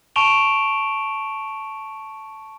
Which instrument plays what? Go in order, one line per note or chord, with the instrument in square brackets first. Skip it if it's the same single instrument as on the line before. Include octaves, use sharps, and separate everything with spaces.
[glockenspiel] A5 C#6 D7 E7 F7 G7